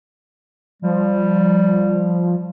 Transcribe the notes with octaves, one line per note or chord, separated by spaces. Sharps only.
F3 G3